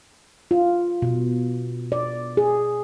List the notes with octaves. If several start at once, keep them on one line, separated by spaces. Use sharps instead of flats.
F4
B2
D5
G#4